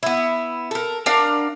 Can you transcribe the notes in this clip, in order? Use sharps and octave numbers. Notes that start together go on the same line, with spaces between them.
B3 E4
A4 A#4
D4 A#4 F5 F#5